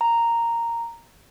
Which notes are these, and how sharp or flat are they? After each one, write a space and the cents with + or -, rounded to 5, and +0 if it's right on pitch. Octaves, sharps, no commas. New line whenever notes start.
A#5 -5